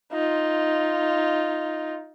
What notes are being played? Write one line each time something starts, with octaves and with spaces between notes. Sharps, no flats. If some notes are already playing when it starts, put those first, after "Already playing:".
D#4 F4